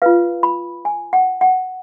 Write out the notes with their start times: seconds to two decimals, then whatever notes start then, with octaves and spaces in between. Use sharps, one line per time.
0.02 F4 B4 F5
0.43 B5
0.85 G#5
1.13 F#5
1.41 F#5